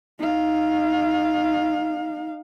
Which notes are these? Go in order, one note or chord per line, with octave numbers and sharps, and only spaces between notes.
D#4 F5